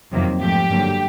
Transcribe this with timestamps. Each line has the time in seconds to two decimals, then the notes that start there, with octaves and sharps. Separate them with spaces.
0.12 F2 C3 D#3 F#3 A#3
0.40 G#2 F3 A3 G4
0.70 G2 D3 F#3 A#3